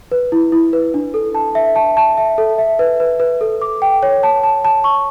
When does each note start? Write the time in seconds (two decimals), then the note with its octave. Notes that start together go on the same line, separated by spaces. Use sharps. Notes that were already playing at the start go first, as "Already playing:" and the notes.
0.12 B4
0.32 E4
0.52 E4
0.73 B4
0.94 D4
1.14 A4
1.35 A5
1.55 E5
1.76 A5
1.97 A5
2.18 E5
2.38 A4
2.58 E5
2.79 B4
3.00 B4
3.20 B4
3.41 A4
3.62 D6
3.82 G5
4.03 C#5
4.23 A5
4.43 A5
4.65 A5
4.84 C#6